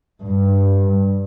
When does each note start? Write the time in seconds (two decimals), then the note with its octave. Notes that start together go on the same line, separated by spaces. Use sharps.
0.23 G2